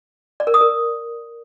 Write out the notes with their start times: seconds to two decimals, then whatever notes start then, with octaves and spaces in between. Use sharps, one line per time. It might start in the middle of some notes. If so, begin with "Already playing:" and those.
0.40 D5
0.47 A#4
0.54 D#6
0.61 A#4